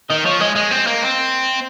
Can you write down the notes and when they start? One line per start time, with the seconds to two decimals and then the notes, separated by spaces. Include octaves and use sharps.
0.10 D#3 D#5
0.25 F3 C#5
0.40 G#3 D#5
0.56 G#3 D#5
0.71 C4
0.87 A#3
1.02 C4